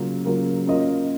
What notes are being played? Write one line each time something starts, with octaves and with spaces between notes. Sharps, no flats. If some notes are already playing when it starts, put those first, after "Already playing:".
Already playing: C#3 F#3 A#3 F4 A#4
C#3 F#3 A#3 F4 A#4
A#3 C#4 F4 A#4 D#5